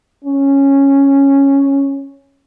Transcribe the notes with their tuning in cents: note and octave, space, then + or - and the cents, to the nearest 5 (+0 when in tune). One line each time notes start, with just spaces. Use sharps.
C#4 -5